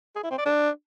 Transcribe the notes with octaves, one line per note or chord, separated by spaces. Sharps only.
G#4
E4
C4
D5
D4